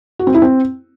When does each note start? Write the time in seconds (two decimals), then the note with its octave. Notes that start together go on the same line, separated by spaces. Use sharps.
0.19 F#4
0.27 C4
0.34 E4
0.42 C4